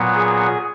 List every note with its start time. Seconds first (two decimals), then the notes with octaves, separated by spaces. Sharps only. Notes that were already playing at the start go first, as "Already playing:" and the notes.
Already playing: A#2 F#3 B3
0.15 G#4